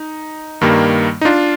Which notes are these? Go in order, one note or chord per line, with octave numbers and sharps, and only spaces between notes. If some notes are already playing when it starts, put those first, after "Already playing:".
Already playing: D#4
G2 D#3 G3 A#3
D#4
D4 F4